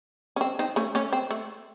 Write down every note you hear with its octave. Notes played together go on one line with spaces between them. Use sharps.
C#4
C4
C4 D#4
A3 C#4
A3 C#4
C4
A3